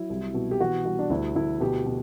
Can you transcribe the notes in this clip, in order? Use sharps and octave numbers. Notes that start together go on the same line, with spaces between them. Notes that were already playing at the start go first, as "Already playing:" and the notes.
Already playing: F#3 E4
C2
B2
G4
E3 F#4
G3 F#4
D4
D2 E4
D2 E4
B2 G4
B2